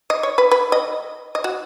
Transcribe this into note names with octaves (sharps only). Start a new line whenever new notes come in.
D#5
C#5
B4
B4
D#5
D#5
F#4